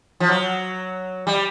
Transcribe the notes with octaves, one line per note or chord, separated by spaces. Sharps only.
F3
F#3
G3